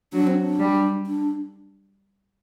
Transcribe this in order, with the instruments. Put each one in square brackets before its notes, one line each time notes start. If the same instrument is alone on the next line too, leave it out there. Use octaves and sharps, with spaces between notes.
[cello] F#3 [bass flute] D4
[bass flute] C4
D4
[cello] G3
[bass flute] D4